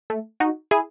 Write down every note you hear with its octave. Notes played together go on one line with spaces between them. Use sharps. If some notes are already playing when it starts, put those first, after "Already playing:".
A3
D#4 F#4
E4 G#4